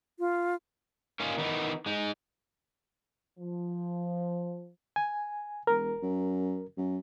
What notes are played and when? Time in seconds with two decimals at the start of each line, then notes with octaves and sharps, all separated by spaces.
0.19 F4
1.20 A#3 C#4 D#4 F4
1.38 D#3 E3 B3 D#4
1.86 G#3 D#4
3.39 F3
4.96 G#5
5.67 E1 A#4
6.02 F#2
6.77 F#2